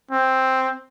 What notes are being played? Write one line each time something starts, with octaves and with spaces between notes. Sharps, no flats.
C4